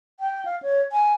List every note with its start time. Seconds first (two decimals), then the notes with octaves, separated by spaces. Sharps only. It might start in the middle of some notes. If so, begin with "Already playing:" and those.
0.20 G5
0.45 F5
0.63 C#5
0.92 G#5